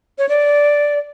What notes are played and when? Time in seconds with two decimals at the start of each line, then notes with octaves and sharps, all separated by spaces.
0.18 C#5
0.29 D5